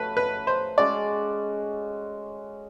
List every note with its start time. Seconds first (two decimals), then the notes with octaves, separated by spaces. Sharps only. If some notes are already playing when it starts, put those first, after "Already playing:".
Already playing: F#3 A3 B4
0.17 B4
0.47 C5
0.78 G#3 C#4 F#4 D5